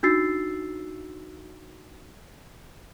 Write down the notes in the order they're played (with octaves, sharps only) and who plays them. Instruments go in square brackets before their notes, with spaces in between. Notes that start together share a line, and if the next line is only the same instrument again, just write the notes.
[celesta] D4 D#4 F#4 E6 A6 C7